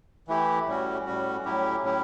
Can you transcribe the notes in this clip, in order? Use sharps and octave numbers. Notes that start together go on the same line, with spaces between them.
E3 A3 E4 G4
A2 G3 C#4 F#4
A2 G3 C#4 F#4
A2 F#3 C#4 E4 G4
A2 F#3 C#4 E4 G4